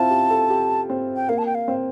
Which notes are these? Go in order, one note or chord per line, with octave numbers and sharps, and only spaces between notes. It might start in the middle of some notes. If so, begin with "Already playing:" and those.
Already playing: C4 E4 F4 A5
G4
A4
G4
C4
G5
A#3 F5
A5
G5
F5
C4